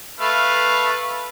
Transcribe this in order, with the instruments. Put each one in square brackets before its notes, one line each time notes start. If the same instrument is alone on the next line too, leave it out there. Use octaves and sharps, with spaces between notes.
[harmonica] A3 B4 F5